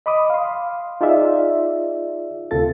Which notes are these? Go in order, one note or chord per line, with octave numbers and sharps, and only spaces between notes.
D#5 B5 D6 D#6
F5 C6
D#4 F4 G#4 D5 E5
D2 C3 F4 A4 A6